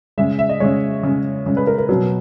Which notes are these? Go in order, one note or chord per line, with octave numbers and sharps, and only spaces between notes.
C#3 G#3 E5
E5
D#5
C#3 G#3 C#5
C#3 G#3
C#3 G#3
B4
A#4
A#4
B2 F#3 B4